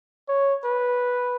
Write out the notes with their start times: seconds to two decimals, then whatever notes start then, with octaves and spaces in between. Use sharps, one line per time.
0.29 C#5
0.64 B4